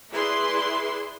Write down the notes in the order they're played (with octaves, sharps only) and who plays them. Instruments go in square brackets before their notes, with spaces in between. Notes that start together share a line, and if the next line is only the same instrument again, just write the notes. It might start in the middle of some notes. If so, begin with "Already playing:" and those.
[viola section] E4 G#4 B4 D5 C6